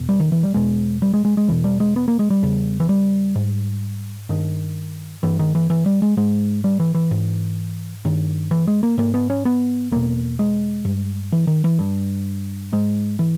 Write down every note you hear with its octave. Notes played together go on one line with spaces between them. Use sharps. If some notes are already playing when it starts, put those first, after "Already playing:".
Already playing: E2 B2
G3
D#3
E3
G3
E2 B2 G#3
G3
G#3
G#3
G#3
E2 B2 E3
G3
G#3
B3
A#3
G#3
G3
E2 C#3
E3
G3
G#2
G2 D#3
G2 E3
D#3
E3
E3
G3
G#3
G#2 G#3
G3
E3
E3
G#2
G2 D#3
E3
G#3
A#3
G#2 A#3
B3
C#4
B3
E2 B2 A#3
G#3
G2
E3
D#3
E3
G2
G#2 G#3
E3